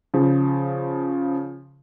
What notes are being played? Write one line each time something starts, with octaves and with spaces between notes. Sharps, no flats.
C#3 F3